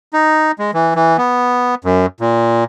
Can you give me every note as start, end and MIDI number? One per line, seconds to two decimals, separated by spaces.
0.13 0.52 63
0.59 0.71 56
0.74 0.94 52
0.95 1.17 52
1.18 1.75 59
1.85 2.06 42
2.21 2.64 46